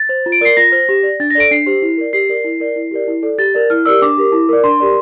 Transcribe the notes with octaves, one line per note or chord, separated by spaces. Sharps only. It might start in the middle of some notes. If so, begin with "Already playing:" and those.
Already playing: A6
C5
F4
D7
A#4 D5 C7
F4 A#6
C5
G4
D5
D4 A6
A#6
A4 D5 D7
D4 C7
G4 C5
E4
A#4 D5
G4 C7
A#4 D5
E4
A#4 D5
E4
G4 A#4 D5
E4
A4 D5
G4 A6
A#4 D5
E4 F6
G4 A#4 D5 E6
D4 D6
G4 A#4
E4
A#4 D5
D4 C6
G4 A#4 D5